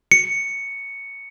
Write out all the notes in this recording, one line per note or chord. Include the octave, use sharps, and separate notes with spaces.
C#7